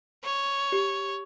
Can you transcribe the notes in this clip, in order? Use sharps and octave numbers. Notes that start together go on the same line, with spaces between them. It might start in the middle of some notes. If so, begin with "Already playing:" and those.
C#5
G4